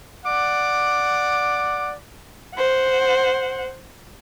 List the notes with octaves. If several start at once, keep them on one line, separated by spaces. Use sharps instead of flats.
D5 F#5 D6
C5 F#5